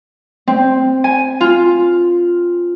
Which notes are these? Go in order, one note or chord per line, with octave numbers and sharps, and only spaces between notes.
C4
G#5
F4